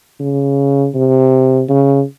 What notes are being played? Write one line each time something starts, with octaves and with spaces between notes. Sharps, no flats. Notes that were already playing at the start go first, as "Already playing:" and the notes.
C#3
C3
C#3